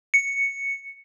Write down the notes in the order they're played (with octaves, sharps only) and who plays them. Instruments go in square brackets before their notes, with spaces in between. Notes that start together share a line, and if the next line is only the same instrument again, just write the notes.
[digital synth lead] C#7